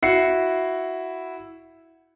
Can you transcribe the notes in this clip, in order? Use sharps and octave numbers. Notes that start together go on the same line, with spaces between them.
E4 F#4 C7 C#7